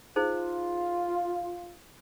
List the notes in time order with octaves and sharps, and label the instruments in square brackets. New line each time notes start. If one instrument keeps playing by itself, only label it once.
[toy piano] D#4 G#4 C5 [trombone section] F4